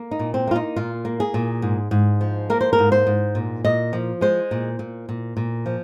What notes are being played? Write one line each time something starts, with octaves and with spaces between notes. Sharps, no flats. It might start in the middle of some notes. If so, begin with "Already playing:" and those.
Already playing: A#3
D#4
A#2
C4
A#3 F4
D#4
A#2 F4
A#3
G#4
A#2
G#2
G#2
F3
A#3 A#4
C5
A#4
G#2
C5
G#2
A#2
A#2 D#5
F3
G#3 C5
A#2
A#2
A#2
A#2
F3